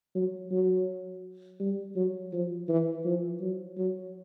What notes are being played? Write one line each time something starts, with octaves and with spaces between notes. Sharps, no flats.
F#3
F#3
G3
F#3
F3
E3
F3
F#3
F#3